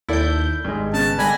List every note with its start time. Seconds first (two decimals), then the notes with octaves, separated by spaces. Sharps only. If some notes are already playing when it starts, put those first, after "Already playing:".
0.09 D#2 E4 A4 D5 G6
0.65 G#1 G2 G#3
0.94 C#3 B3 A5
1.19 D3 G3 G#3 G#5 B5 A#6